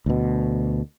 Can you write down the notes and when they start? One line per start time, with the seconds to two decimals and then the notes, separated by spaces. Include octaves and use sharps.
0.06 D2 B2